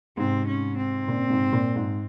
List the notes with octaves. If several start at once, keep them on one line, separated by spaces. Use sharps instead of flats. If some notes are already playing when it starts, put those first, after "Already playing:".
G#2 C3 C4
C#4
C4
A#2 C#3
G#2 C3
A#2
G#2